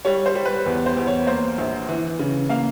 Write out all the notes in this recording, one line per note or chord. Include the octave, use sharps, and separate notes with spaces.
G3 C#5
C5
G3
B4
E2
C5
E2
C#5
A#3 C5
A#1
E3
C#3
A#3 F5